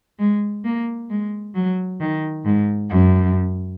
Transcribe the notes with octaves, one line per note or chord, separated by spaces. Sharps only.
G#3
A#3
G#3
F#3
D#3
G#2
F#2